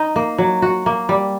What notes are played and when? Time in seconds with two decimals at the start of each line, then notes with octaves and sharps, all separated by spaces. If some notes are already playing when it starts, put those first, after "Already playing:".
Already playing: D#4
0.16 A#3
0.38 F#3
0.62 F#4
0.86 A#3
1.09 G3